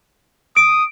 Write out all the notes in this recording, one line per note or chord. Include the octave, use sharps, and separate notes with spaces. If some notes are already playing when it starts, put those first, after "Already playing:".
D#6 D7